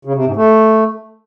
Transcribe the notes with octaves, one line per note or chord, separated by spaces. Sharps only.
C#3
C3
G#2
A3